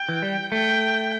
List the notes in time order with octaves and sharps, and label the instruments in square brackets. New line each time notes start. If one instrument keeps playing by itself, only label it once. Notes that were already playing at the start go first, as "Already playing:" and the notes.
Already playing: [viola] G5
[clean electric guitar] E3
G3
[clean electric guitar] A3 [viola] G5